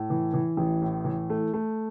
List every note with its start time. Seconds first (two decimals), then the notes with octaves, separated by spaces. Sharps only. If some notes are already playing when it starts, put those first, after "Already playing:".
Already playing: A2
0.10 E3
0.34 E3
0.57 A1
0.82 A2
1.05 E3
1.30 A3
1.53 A3